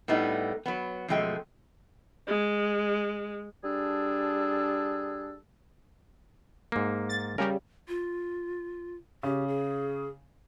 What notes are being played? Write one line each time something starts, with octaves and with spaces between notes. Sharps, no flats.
A2 G3 A3 B3 D#4
F#3 B3
F#2 B2 F3 G#3 A3 G5
G#3
G3 D4 G#4 A4
G#2 A#3
A6
C#3 G3 A#4
F4
C#3 G4
G#4